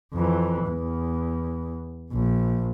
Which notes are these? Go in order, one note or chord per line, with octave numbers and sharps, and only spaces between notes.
F2 E3
E2
A#1